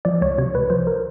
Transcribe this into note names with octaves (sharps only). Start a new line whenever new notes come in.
F3 D5
C#2 C#5
C3 C#5
C#2 B4
F3 C5
A#4